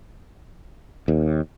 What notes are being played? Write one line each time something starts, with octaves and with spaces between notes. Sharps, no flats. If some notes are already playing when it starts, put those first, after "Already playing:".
D#2